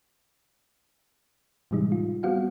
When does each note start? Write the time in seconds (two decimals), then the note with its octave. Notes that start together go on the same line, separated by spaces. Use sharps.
1.71 A2 C3 E3 G3 G#3 D#4
1.92 F4
2.23 G3 B3 C4 F#4 F5 F#5